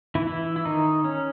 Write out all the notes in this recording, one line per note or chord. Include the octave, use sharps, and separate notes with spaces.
E3 E4
E3 E4
E4
D#3 D#4
C#4